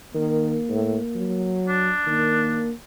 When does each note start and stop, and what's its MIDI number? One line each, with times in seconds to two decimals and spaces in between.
0.14 0.58 51
0.14 1.66 58
0.70 0.98 45
1.15 1.92 54
1.69 2.70 62
2.07 2.64 51
2.07 2.73 58